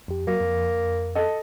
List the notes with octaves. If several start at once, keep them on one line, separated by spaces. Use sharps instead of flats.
F2 G4
F#3 A#3
F2
A4 D#5